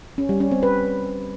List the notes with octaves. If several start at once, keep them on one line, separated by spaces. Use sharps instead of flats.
C#4
G3
C#4
C4
B4